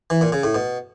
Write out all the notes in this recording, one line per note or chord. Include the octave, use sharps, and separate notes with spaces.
E3
A#2
C#3
A2
B2